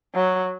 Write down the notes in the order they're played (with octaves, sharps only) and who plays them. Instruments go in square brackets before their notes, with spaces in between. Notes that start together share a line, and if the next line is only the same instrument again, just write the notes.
[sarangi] F#3